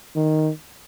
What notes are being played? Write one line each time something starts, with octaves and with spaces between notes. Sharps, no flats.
D#3